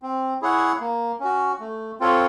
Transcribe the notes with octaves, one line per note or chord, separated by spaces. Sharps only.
C4
E4 G#4 C#5 F#5
A#3
C#4 F#4
A3
C4 F4 A4 C#5